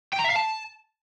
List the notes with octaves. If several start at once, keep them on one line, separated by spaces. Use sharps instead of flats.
G5
A#5
E5
F5
A5